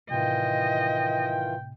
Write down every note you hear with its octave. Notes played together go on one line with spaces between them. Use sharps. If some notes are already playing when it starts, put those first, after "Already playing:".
A2 C3 D#3 E3 F4 D#5 G5